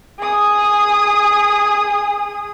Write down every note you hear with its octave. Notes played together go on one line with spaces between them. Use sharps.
G#4 D#6